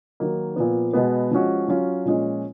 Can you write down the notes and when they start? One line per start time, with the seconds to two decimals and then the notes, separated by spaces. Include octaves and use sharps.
0.20 D#3 F#3 A#3 D#4
0.56 A#2 F3 B3
0.93 B2 G#3 B3
1.31 F3 G#3 C#4 F#4
1.68 F#3 C#4 F4
2.05 A#2 F3 G#3 C#4